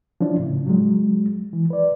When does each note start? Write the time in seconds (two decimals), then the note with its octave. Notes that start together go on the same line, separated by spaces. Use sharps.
0.21 F3 C#4 D4 E4
0.39 A2 C#3
0.66 F#3 G#3
1.53 E3
1.70 B4 D5